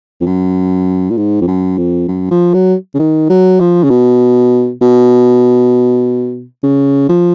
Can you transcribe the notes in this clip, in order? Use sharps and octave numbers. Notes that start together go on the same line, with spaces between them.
F2
F#2
A#2
G#2
F2
F#2
F2
F#2
F3
F#3
C#3
D#3
F#3
F3
C#3
B2
B2
C#3
F3